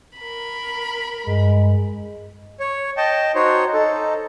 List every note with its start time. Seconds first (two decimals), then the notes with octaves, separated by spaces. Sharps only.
0.17 A#4 B5
1.27 G2 G#3
2.60 C#5
2.97 D#5 G5 A5
3.35 D#4 F#4 C5 C#5
3.73 D#4 A4